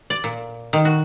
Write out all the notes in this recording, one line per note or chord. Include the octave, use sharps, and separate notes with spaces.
D5
A#2
D#3
F#4